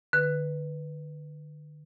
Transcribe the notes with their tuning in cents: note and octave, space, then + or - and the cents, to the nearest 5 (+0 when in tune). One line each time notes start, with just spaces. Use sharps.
D3 +40 B4 +0